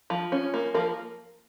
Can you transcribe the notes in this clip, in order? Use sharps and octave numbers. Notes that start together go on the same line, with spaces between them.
F3
C#4
A#3
F3 A#4